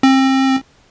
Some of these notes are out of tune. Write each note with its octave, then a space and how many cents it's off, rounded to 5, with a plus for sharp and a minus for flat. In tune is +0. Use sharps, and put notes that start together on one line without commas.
C4 +30